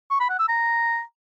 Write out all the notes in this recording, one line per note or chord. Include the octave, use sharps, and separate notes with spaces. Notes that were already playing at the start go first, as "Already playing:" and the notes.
C#6
B5
F#5
E6
A#5